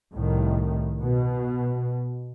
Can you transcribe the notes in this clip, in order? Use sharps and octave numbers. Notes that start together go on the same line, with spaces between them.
C2 A2 D#3
B2